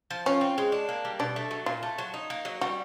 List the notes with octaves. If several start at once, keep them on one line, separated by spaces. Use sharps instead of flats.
F3
C#4 F4
C4
G#3
D4
A#3
G3
B2 D4
A3
F#3
A#2 F4
A3
F#3
D#4
A#3
F#3
G3 F#4